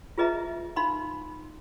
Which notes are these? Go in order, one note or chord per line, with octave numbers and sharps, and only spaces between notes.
F4 G#4 B4 D#5 E5 A#5
D#4 F5 B5 C6